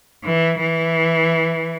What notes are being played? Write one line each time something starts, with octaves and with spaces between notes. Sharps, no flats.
E3
E3